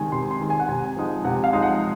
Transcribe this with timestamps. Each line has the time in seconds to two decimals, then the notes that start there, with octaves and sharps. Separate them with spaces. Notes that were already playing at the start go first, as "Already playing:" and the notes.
Already playing: C3 D#3 G#3 G#5
0.12 C3 C6
0.31 C6
0.40 D#3 G#3
0.50 G#5
0.59 F#5
0.69 C3 G#5
0.97 F3 G#3 D#4
1.24 C3 F#5
1.44 F5
1.53 F3 G#3 D#4
1.62 F#5